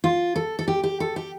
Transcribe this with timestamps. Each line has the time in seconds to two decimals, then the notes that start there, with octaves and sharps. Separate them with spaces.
0.04 F4
0.36 A4
0.59 A4
0.68 G4
0.84 G4
1.00 A4
1.16 G4